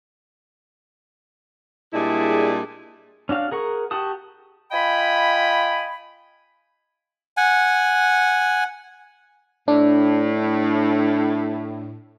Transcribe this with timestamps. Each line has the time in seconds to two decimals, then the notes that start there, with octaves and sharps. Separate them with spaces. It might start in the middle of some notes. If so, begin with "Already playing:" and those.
1.93 A#2 G3 G#3 D4 E4 G#4
3.29 C#4 D4 F#4 F5
3.51 G#4 A#4 F#5 C#6
3.91 F#4 G4 A5 D#6
4.72 F4 D#5 G5 G#5 B5
7.37 F#5 G#5
9.68 A2 D4